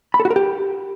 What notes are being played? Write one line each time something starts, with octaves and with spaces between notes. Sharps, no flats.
B5
A4
F#4
A#4
G4